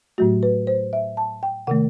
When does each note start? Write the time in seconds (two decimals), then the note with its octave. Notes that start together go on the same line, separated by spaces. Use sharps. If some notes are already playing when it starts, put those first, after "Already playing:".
0.18 A2 F#3 A3 F#4
0.43 B4
0.67 C5
0.93 E5
1.17 A5
1.43 G5
1.67 C3 D#3 A3 F#5